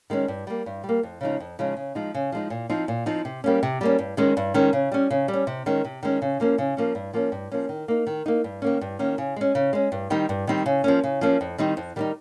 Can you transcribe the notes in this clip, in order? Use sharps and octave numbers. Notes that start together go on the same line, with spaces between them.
D#3 G#3 C#4
G2
G3 A#3
G2
G3
A#3
F2
C#3 F3 G#3 D#4
F2
C#3 F3 G#3 D#4
C#3
F3 G#3 D#4
C#3
F3 G#3 D#4
A#2
F3 C4 D#4
A#2
F3 C4 D#4
C3
G3 A#3 C#4
C3
G3 A#3 C#4
G2
D#3 G#3 C#4
G2
D#3 G#3 C#4
C#3
G3 C#4
C#3
G3
C#4
C3
D#3 G#3 C#4
C3
D#3 G#3 C#4
C#3
F3 A#3 C#4
C#3
F3 A#3 C#4
G2
F3 A#3 C#4
G2
F3 A#3 C#4
D#3
A#3 D#4
D#3
A#3 D#4
G2
D#3 A#3 C#4
G2
D#3 A#3 C#4
C#3
G#3 C#4
C#3
G#3 C#4
G2
D#3 G3 C4 D#4
G2
D#3 G3 C4 D#4
C#3
F3 A#3 C#4
C#3
F3 A#3 C#4
F2
D#3 G3 C4 D#4
F2
D#3 G3 C4 D#4